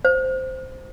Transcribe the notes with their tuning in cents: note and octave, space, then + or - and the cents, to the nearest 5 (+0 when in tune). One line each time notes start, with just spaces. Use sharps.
C5 -5